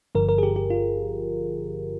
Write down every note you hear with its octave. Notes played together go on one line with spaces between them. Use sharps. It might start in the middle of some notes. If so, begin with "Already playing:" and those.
G1 G2 D3 F3 A#4
A#4
G#4
G4
G4
F4